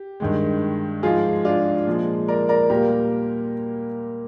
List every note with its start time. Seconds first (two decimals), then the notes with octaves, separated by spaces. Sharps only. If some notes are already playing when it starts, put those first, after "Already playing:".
Already playing: G4
0.20 G2 D#3 G#3
1.03 G#2 F3 G#3 F4 G#4
1.45 D4 F4
1.87 A#2 F3 G#3
2.28 A#4 D5
2.49 A#4 D5
2.69 A#2 G3 A#3 G4 A#4